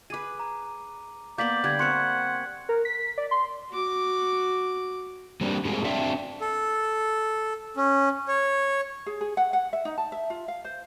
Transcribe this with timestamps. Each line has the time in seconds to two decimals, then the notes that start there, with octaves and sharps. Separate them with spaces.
0.10 G#4 B4 D6 D#7
0.40 A#5
1.38 A#3 B3 D5 G6 B6 F#7
1.64 D3 G3 F#6 G#6
1.79 C4 A#4 F#5 C6 C#6 C#7
2.69 A#4
2.85 B6
3.18 D5
3.31 C6
3.70 F#4 D6
5.41 G3 A#3 C4 D4
5.65 A2 G3 G#3 A#3 C4 G#4
5.85 C4 D4 E5 F5
6.41 A4
7.77 C#4
8.28 C#5
9.06 G#4
9.21 G#4
9.37 F#5
9.53 F#5
9.73 E5
9.85 D#4
9.98 A5
10.12 E5
10.30 F4
10.48 F5
10.65 C5